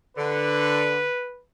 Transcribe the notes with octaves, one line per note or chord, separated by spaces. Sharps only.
D3 B4